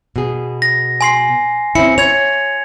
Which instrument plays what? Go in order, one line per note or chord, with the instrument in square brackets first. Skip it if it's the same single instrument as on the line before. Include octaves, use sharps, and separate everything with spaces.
[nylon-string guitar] B2 G#4
[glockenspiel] A#6
G#5 C6 C7
[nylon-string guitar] C4 C#4 E4 [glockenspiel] C#7
[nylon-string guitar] C#5 [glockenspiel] G#6 F7